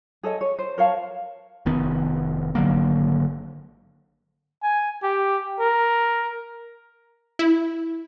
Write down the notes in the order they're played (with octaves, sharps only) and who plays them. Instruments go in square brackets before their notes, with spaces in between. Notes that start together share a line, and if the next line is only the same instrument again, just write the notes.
[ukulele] G#4 A4 C#5 D#5
C#5
C5
A#4 C#5 F5 A5
[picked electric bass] F1 D#3 B3
G#1 D3 F#3 A#3
[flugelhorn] G#5
G4
A#4
[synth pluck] E4